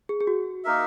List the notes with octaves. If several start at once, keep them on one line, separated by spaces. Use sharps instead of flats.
G#4
G#4
F#4
A#3 D#4 A#4 E5